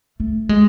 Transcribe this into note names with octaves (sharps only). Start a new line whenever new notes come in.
A3
G#3